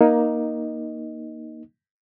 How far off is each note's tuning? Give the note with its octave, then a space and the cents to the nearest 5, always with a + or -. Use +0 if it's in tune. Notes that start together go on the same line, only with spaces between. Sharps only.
A#3 +15 D#4 +0 D#5 +0